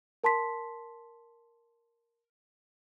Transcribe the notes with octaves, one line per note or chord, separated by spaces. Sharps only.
A#4 A5 C6 B6